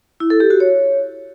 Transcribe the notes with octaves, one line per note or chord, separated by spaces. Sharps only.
E4
A4
G4
F#4
C#5